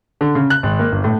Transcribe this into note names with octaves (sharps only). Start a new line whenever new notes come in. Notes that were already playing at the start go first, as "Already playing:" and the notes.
D3
C#3
F#6
G#1
A#3
G1
A2